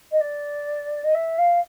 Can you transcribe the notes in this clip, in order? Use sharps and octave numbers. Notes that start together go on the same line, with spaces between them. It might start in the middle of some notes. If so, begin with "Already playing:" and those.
D#5
D5
D#5
E5
F5